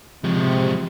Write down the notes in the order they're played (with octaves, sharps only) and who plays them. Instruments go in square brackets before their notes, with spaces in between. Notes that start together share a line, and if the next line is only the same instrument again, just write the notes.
[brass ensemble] C3 [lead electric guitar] F3 G#3